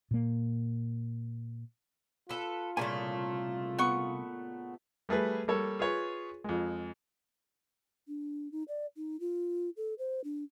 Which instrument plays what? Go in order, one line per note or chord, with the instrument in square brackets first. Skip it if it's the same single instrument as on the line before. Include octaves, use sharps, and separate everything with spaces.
[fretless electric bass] A#2 A#3
[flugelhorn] F4 [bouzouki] A4 B4
[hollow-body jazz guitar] C2 C#5 G#5 [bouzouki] A#2 C#3 A3
[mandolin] B3 C#6
[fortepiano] G3 A3 G#4 B4
G3 A#3 A4 C#5
F4 G#4 B4 C#5
F2 G#3
[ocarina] D4
D#4
D5
D#4
F4
A4
C5
D4